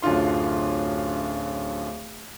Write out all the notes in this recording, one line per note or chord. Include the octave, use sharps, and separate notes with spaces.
D1 F#2 D3 F4 C6